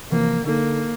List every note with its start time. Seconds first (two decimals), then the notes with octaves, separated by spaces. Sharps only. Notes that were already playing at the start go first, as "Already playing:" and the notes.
0.11 C3 E3 F3 A#3
0.46 D3 A#3 D#4 A4